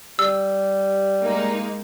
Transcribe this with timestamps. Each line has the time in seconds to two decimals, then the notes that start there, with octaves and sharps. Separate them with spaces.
0.19 G3 E6
1.23 G#3 A#3 D#4